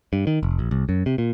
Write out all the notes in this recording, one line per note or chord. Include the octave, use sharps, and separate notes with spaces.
G2
D#3
F1
A#1
C2
F#2
C3
A#2